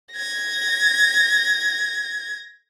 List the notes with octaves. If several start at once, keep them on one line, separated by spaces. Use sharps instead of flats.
G#6 A#6